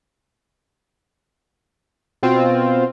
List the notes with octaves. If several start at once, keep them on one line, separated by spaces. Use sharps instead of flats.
B2 C4 F4